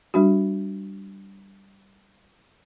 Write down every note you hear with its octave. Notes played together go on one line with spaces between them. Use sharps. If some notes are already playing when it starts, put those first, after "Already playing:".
G3 D4 F#4